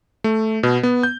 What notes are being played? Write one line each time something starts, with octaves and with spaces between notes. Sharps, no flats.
A3
B2
B3
G6